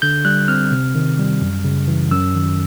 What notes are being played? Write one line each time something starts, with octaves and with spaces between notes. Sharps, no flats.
D3 G6
G3 F#6
C4 F6
C3
D#3
G3
F#2
C#3
E3
F#2 E6
D#3